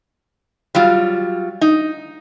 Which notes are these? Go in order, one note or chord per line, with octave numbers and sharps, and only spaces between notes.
F#3 G3 F4
D#4